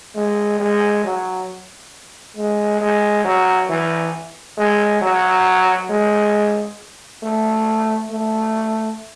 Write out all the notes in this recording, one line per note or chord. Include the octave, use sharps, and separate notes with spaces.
G#3
G#3
F#3
G#3
G#3
F#3
E3
G#3
F#3
G#3
A3
A3